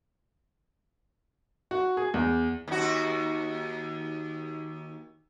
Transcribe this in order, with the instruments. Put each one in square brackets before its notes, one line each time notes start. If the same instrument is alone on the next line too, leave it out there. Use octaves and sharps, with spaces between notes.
[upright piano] F#4
G#4
E2
[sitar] D#2 F#4